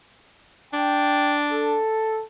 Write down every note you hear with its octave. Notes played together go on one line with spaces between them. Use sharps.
D4 G5
A4